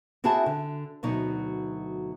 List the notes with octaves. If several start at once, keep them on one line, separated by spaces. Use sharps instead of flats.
C4 E4 F#4 G#4 E5 A5
D3
D2 B2 F#3 D#4